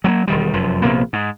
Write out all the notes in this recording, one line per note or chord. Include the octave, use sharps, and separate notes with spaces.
F#3 G#3 A#3
E1 D#3 G3
F1 F#2 F3
A#1 C3 A#3 B3
G#2